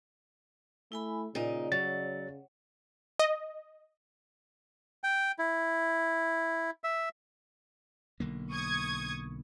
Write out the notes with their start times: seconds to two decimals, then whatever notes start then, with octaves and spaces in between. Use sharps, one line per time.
0.92 A3 E4 G#5 B5
1.35 A#2 C#3 D#4 D5 D#5
1.72 F#3 A6
3.19 D#5
5.04 G5
5.39 E4
6.84 E5
8.20 B1 D3 A#3
8.51 C#6 D#6 G#6